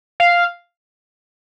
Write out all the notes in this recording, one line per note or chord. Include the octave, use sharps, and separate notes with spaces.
F5